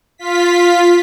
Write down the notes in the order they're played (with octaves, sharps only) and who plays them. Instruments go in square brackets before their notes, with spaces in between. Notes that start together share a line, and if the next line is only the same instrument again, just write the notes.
[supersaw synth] F4 B6